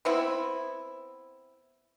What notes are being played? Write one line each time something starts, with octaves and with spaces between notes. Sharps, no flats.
B3 C4 E4